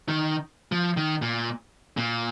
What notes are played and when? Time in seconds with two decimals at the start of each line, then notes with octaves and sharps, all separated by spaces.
0.09 D#3
0.72 F3
0.97 D#3
1.22 A#2
1.97 A#2